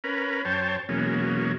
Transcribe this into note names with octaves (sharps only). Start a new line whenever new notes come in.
C#4 A#4 B4
F#2 C5 C#5 G5 A5
E2 B2 F#3 G#3 A#3 C#4